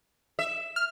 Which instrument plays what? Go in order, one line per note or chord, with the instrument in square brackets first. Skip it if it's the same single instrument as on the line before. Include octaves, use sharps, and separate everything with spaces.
[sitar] E5
[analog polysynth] F6